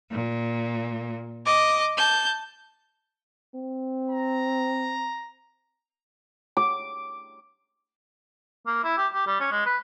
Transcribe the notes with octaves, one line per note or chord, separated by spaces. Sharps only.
A#2
D#5 D6
A5 G6
C4
A#5
D6
A#3
E4
G4
G4
G3
C#4
G#3
B4